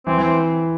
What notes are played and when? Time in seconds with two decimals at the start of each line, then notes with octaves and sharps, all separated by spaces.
0.07 E3 C4
0.18 E3
0.24 C4